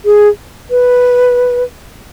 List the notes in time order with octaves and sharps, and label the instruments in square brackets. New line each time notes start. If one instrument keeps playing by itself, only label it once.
[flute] G#4
B4